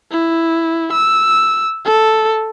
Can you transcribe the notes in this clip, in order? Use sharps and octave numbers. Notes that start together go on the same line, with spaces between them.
E4
E6
A4